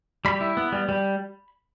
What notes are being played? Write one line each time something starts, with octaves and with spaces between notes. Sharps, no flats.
G3 B5
E4
B3
G3
G3